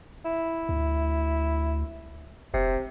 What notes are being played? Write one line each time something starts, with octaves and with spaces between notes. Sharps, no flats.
E4
D2
F1 C3